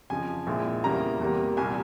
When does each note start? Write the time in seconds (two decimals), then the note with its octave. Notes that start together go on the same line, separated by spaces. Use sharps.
0.10 F2 C#3 F3 G#5
0.47 A#1 A#2 G#3 C4 E4
0.84 E2 C#3 G3 A#3 E4 A#5
1.21 E2 C3 G3 A#3
1.57 C2 A#2 G3 G#5